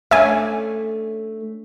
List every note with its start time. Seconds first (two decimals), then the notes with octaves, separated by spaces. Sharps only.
0.11 A3 C#4 D4 E5 G#5